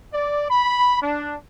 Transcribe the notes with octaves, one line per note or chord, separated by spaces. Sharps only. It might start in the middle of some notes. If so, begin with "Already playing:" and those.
D5
B5
D4